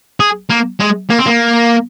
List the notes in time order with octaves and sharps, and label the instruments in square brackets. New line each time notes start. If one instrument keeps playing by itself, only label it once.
[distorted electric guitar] G#4
A#3
G#3
A#3
C4
A#3